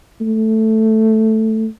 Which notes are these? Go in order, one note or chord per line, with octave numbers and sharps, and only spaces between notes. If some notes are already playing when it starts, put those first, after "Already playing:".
A3